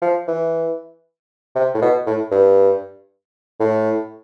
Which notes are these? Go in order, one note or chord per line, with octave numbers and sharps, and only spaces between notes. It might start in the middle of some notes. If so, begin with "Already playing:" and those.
F3
E3
C3
A2
B2
A2
G2
A2